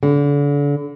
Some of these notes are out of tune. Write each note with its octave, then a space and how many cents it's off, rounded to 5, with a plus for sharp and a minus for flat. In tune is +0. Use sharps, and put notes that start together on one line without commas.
D3 -35